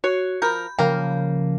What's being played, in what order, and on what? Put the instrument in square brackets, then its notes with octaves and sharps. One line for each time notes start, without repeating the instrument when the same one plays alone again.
[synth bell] F#4 [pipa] C#5
[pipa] F3 A#4 [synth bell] B5 G6
[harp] C#3 F3 [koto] A#3 [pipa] F5 G5